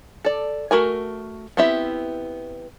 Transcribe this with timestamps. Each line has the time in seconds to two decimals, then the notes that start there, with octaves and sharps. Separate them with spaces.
0.25 A4 D5
0.71 A3 F#4 A#4 G#5
1.57 B3 C4 E4 G4 E5